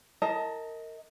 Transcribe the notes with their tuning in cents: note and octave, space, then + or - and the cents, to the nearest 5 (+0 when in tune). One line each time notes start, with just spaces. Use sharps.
A#4 -25 D#5 +25 A5 -10